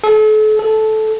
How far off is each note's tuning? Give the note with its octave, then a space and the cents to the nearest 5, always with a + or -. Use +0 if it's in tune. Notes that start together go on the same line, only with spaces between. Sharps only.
A4 -40
A4 -15